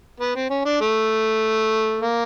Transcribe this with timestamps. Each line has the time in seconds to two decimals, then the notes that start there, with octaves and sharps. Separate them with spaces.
0.20 B3
0.35 C4
0.50 C#4
0.65 D4
0.81 A3
2.00 A#3